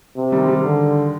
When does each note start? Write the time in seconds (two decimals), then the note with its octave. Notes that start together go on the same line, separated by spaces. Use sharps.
0.16 C3
0.32 D#3 G3
0.42 G#3
0.48 D#3 G3
0.64 D3